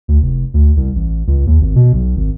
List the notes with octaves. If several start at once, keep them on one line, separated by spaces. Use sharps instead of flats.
D2
F1
D2
C2
A1
C#2
D#2
G#1
B2
B1
G#1